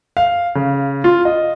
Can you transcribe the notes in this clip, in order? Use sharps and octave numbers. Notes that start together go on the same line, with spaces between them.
F5
C#3
F4
D#5